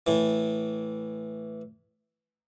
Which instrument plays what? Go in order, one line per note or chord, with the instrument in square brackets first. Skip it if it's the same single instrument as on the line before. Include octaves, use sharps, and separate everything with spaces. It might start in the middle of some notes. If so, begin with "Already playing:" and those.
[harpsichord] A2 E3